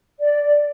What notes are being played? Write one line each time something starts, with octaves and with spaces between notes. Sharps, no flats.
D5